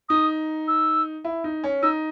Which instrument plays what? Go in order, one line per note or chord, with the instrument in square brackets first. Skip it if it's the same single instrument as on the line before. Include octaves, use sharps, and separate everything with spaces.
[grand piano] D#4 [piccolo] D#6
[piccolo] E6
[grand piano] E4
D#4
C#4
[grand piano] D#4 [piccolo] E6